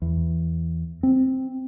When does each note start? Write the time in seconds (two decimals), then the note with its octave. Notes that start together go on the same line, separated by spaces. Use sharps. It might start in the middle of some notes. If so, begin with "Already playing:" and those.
0.02 E2
1.03 C4